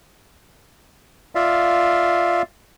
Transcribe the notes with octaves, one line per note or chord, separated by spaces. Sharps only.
F4 D5 E5 F5